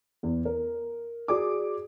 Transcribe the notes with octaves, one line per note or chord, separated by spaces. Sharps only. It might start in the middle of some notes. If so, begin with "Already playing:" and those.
E2
A#4
F#4 G#4 D5 D6